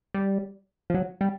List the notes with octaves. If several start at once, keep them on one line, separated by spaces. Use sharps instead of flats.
G3
F3
F#3
G3